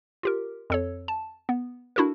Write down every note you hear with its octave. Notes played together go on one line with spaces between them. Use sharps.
F4 G4 A#4
F2 A4 C#5
A5
B3
D4 E4 F#4 A4 A#4